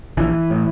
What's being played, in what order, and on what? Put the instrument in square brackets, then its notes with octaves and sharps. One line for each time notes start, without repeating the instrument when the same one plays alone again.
[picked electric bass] A#1 E3
A2